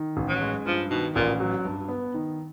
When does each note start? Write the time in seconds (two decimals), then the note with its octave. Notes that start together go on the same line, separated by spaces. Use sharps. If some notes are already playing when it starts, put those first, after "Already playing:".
Already playing: D#3
0.17 A1
0.29 F#3
0.42 G#3
0.66 G2 F3
0.90 B2 D#3
1.15 A1 A#2
1.40 F#3
1.65 G2
1.88 B3
2.14 D#3